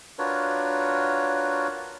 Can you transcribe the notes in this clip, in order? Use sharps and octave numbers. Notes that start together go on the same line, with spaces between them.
D4 F4 F#4 A#4 B4 C#5